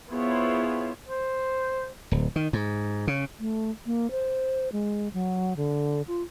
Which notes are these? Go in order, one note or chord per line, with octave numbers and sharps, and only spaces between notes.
B3 E4 F4 G#4 C5 C#5
C5
D1
D#3
G#2
C#3
A3
A#3
C5
G#3
F#3
D3
F4